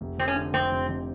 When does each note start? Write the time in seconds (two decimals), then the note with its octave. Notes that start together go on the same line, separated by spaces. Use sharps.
0.01 F1
0.18 F2 C4
0.28 C#4
0.36 D3
0.53 F1 C4
0.71 F1
0.89 F2